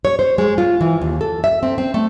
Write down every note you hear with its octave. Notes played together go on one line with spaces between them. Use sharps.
C#5
C5
G#3
F4
E3
D#2
A4
E5
C4
C4
A3